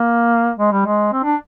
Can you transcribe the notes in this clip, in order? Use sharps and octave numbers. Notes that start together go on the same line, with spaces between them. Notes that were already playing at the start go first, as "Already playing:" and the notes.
Already playing: A#3
G#3
G3
G#3
C4
D4